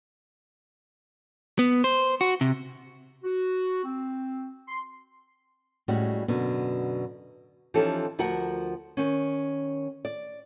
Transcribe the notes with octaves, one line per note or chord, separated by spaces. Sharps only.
B3
C5
F#4
C3
F#4
C4
C6
A2 G3 G#3 C#4 F#4
F#2 B2 D3
E3 F3 C#4 D#4 G4 A4
D2 F3 F#4 A#4 F#5
D#3 C#4
D5